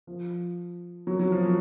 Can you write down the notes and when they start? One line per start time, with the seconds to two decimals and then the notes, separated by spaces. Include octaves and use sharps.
0.07 F3
1.07 F#3
1.19 F#3
1.32 F3
1.45 F#3